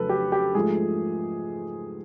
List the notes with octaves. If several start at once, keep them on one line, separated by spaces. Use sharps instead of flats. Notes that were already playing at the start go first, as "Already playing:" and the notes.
Already playing: F2 C#3 F#3 A3 A4 B4
G4
G4
G#2 F3 A3 G#4